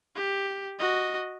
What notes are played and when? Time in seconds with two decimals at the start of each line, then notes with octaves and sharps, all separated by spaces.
0.16 G4
0.79 F#4 D#5